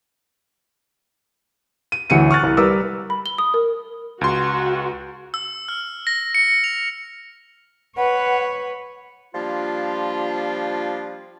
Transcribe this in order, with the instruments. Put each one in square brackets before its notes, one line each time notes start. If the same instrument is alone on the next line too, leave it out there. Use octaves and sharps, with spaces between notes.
[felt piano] D#7
A1 D2 E3 C#7 D#7
C#6 F6 F#6 A6
C2
G3 A#4 B4 D6 E6
[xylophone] B5
G7
D#6
A#4
[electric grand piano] C#2 C6 [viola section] F#4
[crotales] E6
F6
A#6
C#7
F7
[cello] B4 C#5 [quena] F#5
[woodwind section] F3 G3 A#3 D4 F4